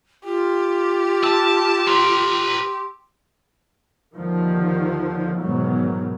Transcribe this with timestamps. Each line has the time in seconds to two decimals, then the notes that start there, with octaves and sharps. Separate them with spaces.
0.25 F4 G4
1.23 A5 E6
1.87 B4 A#5 C6
4.14 D#2 D3 D#3 F3
5.41 E2 G#2 B2 D#3 F#3